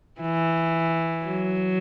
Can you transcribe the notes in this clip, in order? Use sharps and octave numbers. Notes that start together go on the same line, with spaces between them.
E3
F#3